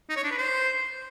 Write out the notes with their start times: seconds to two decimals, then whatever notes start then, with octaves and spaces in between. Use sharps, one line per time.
0.10 D#4
0.17 C#5
0.24 D4
0.31 B4
0.38 C5